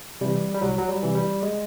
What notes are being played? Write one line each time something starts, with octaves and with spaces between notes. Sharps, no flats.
C3 E3 G3
G3
C2 F#3
F#3
G3
C3 E3
G3
G#3